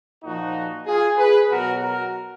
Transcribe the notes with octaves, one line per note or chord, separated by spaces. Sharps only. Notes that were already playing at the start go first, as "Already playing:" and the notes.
A#2 F3 D#4 F#4
F4 G#4
G#4 B4
B2 F#3 F#4 A#4
F#4 A#4